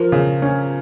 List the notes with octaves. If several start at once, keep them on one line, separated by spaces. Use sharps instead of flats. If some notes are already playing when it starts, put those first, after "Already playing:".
Already playing: F3 A#4
C#3
C#4